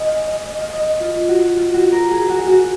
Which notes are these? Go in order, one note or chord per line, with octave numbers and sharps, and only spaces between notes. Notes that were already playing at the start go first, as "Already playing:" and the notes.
Already playing: D#5 G#5
F5
D#5
D#5
F5
D#5
F4
F#4
F4
F#4
A#4
G#4
F#4
F#4